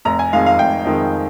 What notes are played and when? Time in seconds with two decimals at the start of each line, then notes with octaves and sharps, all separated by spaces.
0.05 F1 A#5
0.19 G#5
0.33 F2 D#3 G#3 F5
0.46 F5
0.59 F1 G5
0.85 F2 D#3 G#3